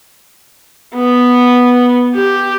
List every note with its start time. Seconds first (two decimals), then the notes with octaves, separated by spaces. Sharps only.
0.95 B3
2.14 G4